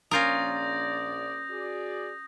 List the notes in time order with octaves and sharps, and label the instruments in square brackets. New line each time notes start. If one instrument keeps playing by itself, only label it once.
[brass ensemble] A#1 D5 [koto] C#4 F4 A#4 [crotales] D#6 G6 A#6
[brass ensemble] F#4 G#4 D5